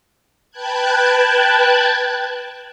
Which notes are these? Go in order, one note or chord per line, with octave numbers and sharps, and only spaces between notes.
B4 G5 A5 F#6 G#6